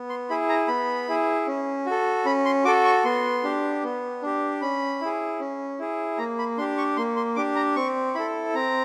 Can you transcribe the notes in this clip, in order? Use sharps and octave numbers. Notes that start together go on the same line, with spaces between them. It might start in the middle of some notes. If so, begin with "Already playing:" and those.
Already playing: B3
C6
E4 G#4 B5
A#5
B3 B5
E4 G#4
C#4
F#4 A4
C#4 B5
C6
F#4 A4 D6
C#6
B3 C6
D4 G4
B3
D4 G4
C#4 B5
E4 G#4
C#4
E4 G#4
A#3 A#5
B5
D4 G4 C6
C#6
A#3 C6
C6
D4 G4 D6
A#5
C4 C#6
E4 A4 B5
C4 A#5